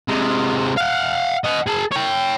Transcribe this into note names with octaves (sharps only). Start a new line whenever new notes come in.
C3 G#3
F5 F#5
D#5 F#5
G#4 A5
C#5 G5